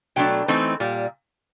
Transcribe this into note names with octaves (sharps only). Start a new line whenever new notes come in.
B2 F#3 A3 D4 G5
E3 A3 C4 D#4
A#2 G3